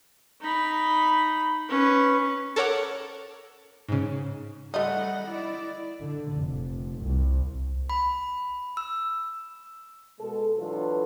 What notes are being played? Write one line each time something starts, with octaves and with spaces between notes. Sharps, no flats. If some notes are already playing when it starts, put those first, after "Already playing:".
D#4 B5
C#4 B4
A4 A#4 C#5 F#5 D6
G#2 C#3
G3 A3 D#4 D#5 F#5
E4 D5
D3
F1
C2
B5
E6
B2 G#3 A4
E3 F#3 D4 F4 A4 B4